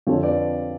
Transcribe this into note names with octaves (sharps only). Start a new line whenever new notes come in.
F2 D3 F3 A4 C#5
B4 D5